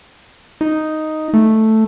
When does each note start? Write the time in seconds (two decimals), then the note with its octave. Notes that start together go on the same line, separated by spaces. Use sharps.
0.61 D#4
1.34 A3